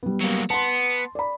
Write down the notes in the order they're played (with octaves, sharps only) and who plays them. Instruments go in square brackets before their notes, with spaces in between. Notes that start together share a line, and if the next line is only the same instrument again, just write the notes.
[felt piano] G3 B3
[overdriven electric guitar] F#3 A#3
[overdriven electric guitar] B3 [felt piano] A5 C6
[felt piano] D5 B5